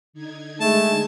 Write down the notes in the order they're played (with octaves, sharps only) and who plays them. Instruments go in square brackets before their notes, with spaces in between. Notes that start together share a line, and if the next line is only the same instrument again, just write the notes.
[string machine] D3 D#4 G#6
[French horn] G#3 [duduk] A3 [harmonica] A5